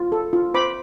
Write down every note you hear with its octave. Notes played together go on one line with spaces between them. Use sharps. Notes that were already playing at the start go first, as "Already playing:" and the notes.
Already playing: F4
A4
F4
C5 B5 D6